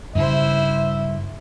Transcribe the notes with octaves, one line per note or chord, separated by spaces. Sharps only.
G2 C#3 G3 E4 C5 E5